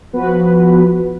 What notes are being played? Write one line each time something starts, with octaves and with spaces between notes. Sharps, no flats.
F3 B3 F#4 B4